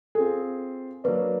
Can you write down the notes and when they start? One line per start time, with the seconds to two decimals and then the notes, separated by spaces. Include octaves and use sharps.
0.15 C4 F4 G#4 A4
1.04 F#3 A#3 D4 B4